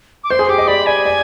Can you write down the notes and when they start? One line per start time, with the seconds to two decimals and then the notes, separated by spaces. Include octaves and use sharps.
0.24 D6
0.30 C5 C6
0.39 G#4
0.48 G4 D6
0.58 D#5
0.68 D5 B5
0.86 D5 G#5
1.05 D5